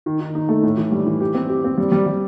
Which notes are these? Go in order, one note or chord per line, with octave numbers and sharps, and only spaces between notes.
D#3
D#3
D#4
A3
A2
E3
G3
E3
G4
C4
G4
C4
G3
G3
G3